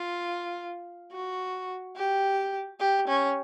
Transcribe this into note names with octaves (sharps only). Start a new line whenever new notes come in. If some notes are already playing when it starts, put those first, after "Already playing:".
Already playing: F4
F#4
G4
G4
C#4